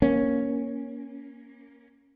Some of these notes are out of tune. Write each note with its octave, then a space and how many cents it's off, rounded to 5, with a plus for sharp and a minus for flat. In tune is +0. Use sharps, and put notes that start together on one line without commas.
A#3 +15 C#4 +0